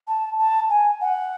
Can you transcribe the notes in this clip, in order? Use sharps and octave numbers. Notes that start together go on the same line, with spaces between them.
A5
A5
G#5
F#5